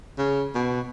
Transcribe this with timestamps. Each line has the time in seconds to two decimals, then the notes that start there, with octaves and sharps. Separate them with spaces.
0.18 C#3
0.55 B2